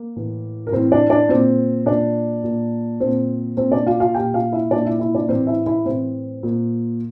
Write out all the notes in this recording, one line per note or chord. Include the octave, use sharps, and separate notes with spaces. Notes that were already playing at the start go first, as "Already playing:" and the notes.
Already playing: A#3
A2 E3
A#4
A2 E3 C4 C5
D4 D5
D4 D5
A#2 C4 C5
A#2 D4 D5
A#2
A#2 C4 C5
A#2 C4 C5
D4 D5
F4 F5
F4 F5
A#2 G4 G5
F4 F5
E4 E5
A#2 D4 D5
E4 E5
E4 E5
D4 D5
A2 E3 C4 C5
E4 E5
E4 E5
A2 E3 C4 C5
A#2